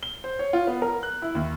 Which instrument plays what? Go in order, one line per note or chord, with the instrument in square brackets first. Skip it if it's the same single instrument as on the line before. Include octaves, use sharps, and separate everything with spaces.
[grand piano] G7
C5
C#5
F4
B3
A#4
F#6
E4
D#2